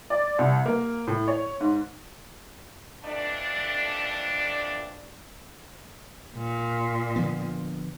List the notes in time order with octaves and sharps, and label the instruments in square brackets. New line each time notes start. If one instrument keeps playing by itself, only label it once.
[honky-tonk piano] D5
C2
A#3
A2
C#5
G#2
[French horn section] F2 E3 A3 D4
[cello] A#2
[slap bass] D3 F3 B3